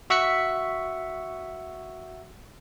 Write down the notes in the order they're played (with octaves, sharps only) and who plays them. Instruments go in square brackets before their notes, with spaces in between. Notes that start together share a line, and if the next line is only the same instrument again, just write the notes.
[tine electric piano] F#4 E5 C#6 F#6 B6 C#7